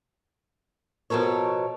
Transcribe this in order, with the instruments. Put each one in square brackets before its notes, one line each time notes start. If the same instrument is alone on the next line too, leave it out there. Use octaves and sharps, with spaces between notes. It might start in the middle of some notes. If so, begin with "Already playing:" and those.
[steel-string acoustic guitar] B2 F3 A4 A#4 C#5